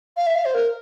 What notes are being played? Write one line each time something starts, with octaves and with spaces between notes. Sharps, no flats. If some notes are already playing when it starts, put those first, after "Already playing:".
F5
E5
F5
C5
A#4